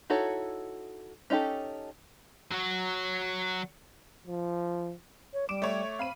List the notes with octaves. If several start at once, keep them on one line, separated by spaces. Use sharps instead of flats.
D#4 E4 F#4 A4 C#5
C#4 D#4 F4 G4 A4
F#3 F#4
F3
C#5
G3 D6 D7 E7
A3 C#5
C4 F5 B5 D#7